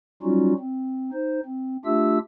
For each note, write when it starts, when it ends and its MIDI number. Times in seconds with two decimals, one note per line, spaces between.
0.23 0.54 54
0.23 0.54 55
0.23 0.54 61
0.23 0.54 63
0.23 0.54 65
0.23 0.54 66
0.59 1.10 60
1.13 1.40 63
1.13 1.40 72
1.45 1.77 60
1.85 2.19 57
1.85 2.19 62
1.85 2.19 65
1.85 2.19 67
1.85 2.19 76
1.85 2.19 88